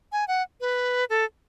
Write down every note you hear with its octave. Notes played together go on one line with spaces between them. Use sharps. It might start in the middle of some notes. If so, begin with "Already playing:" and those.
G#5
F#5
B4
A4